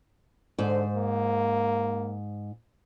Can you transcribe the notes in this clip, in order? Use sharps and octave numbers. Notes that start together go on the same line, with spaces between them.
G#2 D3 C5
A#3